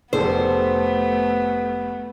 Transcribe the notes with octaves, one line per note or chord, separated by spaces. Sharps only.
F1 A3 B3 A4 C5